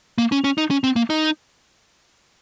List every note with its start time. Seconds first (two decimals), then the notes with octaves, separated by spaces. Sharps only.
0.18 A#3
0.32 C#4
0.44 C#4
0.58 D#4
0.71 C#4
0.84 C4
0.96 A#3
1.10 D#4